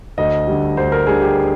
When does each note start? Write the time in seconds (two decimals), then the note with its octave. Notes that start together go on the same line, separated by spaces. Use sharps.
0.18 D2 D#5
0.47 D3 G3
0.77 D2 C5
0.92 A#4
1.07 D3 G3 G#4
1.22 G4